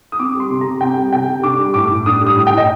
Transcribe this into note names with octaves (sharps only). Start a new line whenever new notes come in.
D#6
C4 D6
G3
C6
C3
A#5
C3
C4 G5
G3
C3 G5
C3
D4 D6
G3
A2 D6
A2
D4 D#6
G3
D#6
A2
G5
A2 D#5